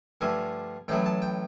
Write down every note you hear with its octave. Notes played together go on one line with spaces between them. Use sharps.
G2 D3 F3 A3 G#5
A1 A2 F#3 A3 G5
A5
G5